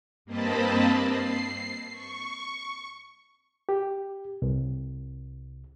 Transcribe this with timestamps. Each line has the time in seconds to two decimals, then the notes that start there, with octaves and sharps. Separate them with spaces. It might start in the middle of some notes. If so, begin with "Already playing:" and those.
0.25 G2 A#3 C4 D#5 A5 B5
1.07 C7
1.91 C#6
3.69 G4
4.42 C2